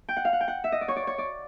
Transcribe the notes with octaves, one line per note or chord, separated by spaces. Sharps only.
G5
F#5
F5
F#5
G5
F#5
E5
D#5
D5
C#5
D5
C#5
D5